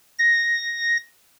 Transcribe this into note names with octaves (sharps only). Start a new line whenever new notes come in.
A#6